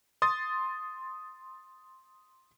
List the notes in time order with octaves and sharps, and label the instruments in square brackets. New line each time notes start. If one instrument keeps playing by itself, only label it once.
[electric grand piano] C6 D#6 A6